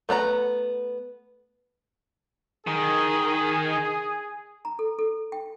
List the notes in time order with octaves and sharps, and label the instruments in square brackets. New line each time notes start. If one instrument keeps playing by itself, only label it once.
[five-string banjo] A3 B3 D5 A#5
[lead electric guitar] D#3 [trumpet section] G#4
[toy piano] A#5
A4
A4
G5